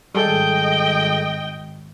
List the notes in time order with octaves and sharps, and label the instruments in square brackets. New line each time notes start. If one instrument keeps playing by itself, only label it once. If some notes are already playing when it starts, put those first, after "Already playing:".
[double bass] G#1 [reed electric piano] G3 G#4 A4 [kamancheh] D#5 G5